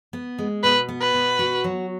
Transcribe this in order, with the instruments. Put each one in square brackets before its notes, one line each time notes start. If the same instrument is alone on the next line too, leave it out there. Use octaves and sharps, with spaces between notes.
[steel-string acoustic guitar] B3
G#3
[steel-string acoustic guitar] B2 [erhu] B4
[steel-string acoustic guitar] B3
[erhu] B4
[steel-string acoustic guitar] B2
F#4
F#3